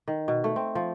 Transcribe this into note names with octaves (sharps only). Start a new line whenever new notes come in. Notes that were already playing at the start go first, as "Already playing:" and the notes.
D#3
B2
A3
C4
F3